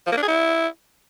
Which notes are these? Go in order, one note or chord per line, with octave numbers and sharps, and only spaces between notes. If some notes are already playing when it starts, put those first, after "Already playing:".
F3
A#3
D4
G#4
E4